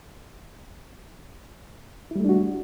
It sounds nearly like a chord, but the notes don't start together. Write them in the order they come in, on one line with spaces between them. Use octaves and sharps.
E4 G3 A3 D4 F#4